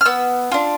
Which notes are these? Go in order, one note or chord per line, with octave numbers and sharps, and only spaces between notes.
F6
B3 E6
D4 F4